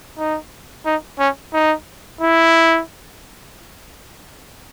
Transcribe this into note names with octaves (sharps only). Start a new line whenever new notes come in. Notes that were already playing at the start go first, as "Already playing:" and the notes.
D#4
D#4
C#4
D#4
E4